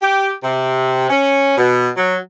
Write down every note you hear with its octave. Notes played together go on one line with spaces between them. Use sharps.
G4
C3
C#4
B2
F#3